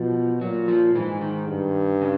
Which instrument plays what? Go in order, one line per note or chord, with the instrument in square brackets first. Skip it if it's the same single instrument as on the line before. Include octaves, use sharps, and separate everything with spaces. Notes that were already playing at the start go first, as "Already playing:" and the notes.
Already playing: [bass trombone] B2 [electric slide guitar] F3
[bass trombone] A#2 [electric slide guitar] F#3
[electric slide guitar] F3
[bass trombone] G#2 [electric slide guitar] E3
[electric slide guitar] D#3
[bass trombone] G2
[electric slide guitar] C#3